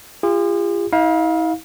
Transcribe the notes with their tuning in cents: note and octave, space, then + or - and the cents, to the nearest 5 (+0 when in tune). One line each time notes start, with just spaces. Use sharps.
F4 -25 G#4 -45
E4 -45 F5 +15